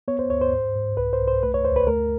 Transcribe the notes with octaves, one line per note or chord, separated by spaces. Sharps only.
B3 C#5
C5
D2 C#5
C5
G#2
G#2
C2 B4
C5
C2
C5
A3 B4
C#5
D2 C5
B4
A3 A#4